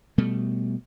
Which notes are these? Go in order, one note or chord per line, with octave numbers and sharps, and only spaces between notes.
B2 G3 A3